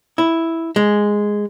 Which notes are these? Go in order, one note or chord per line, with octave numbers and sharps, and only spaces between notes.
E4
G#3